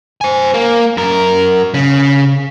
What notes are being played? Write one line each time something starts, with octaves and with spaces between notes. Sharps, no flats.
C5 G#5
A#3
F#2 A#4
C#3